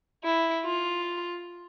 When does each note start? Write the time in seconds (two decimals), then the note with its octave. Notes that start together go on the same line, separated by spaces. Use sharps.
0.24 E4
0.65 F4